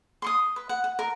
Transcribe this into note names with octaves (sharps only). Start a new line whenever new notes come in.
C6 C#6 D#6
B4
F#5
F#5
A#4